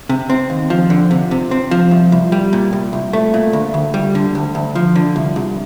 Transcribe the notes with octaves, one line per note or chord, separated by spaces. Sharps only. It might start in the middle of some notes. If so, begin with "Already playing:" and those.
C3
C4
D#2
F3
D3
C3
C3
C4
F3
C2
C2
G3
A#2
C2
C2
A3
A#2
D2
D2
G3
D3
D2
D2
F3
D3
C2
C2